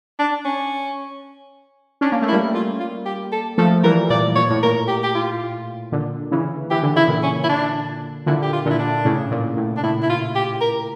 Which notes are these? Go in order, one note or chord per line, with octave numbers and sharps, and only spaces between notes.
D4
C#4
C#4 D4
A#3
A3
E4
G3 A#3
F4
F4
G4
A4
F3 A3 A4
E3 G3 A#4
A#2 D5
A#2 C#5
A2
A#2 A#4
G4
G4
F4
A#2 D3
C#3 E3
E3 G4
D3
C#3 E4
A#2 D3
C#4
E4
D4
A#2 D3 E4
G4
F4
A#2 D3 E4
D4
A2 C#3
A#2
A2
D4
A2 E4
E4
F4
G4
A#4